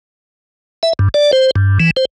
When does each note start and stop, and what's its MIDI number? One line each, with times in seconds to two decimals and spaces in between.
0.83 0.93 76
0.99 1.09 43
1.14 1.31 74
1.33 1.51 72
1.56 1.78 43
1.80 1.91 52
1.97 2.05 72